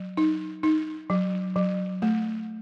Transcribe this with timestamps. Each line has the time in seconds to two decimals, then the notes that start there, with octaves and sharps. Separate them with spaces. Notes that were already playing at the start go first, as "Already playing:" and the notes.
Already playing: F#3
0.17 D#4
0.63 D#4
1.10 F#3
1.56 F#3
2.02 A3